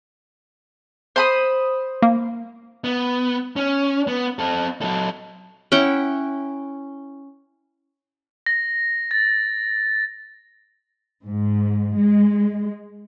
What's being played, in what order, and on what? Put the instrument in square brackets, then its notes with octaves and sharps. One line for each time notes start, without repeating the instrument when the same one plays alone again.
[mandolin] C5 B5 D#6
[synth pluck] A#3
[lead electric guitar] B3
C#4
B3
C4 A4
F#3 A4
[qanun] C#4 E4 F#5 G5
[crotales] A#6
A6
[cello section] G#2
G#3